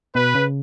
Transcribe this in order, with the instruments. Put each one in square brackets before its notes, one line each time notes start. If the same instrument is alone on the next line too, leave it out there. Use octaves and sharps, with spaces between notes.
[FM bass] B2 [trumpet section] B4
[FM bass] C#3